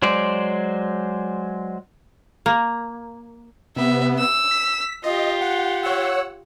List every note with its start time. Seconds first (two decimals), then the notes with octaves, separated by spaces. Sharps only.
0.02 F#3 G#3 C5 D5
2.46 A#3
3.76 C3 B3 E5
4.19 E6
4.51 B6
5.04 F4 G4 D#5
5.41 F#5
5.83 C#5 F#5 E6